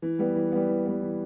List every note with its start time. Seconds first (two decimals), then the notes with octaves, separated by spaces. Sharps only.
0.02 E3
0.19 G3 B3
0.35 E3
0.52 G3 B3
0.69 E3
0.86 G3 B3
1.02 E3